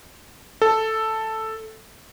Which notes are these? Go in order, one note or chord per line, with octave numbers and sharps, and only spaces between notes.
A4